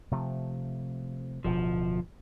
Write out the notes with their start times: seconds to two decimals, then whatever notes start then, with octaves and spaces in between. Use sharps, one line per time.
0.11 C3 F3 A3
1.44 D1 D2 B2 F3